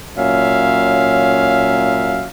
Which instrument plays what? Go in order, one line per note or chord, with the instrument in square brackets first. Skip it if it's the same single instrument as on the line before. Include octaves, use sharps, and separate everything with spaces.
[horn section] A#2 F#3 C#4 E5 F5